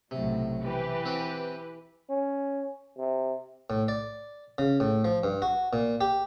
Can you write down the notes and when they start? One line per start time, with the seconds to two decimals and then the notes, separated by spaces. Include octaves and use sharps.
0.11 B1 A2 C3 F#3
0.61 E3 G4 B4
1.05 C4 F#4
2.09 C#4
2.98 C3
3.70 A2
3.88 D5
4.58 C#3
4.80 A2
5.04 F3
5.24 G2
5.42 F#4
5.73 A#2
6.01 G4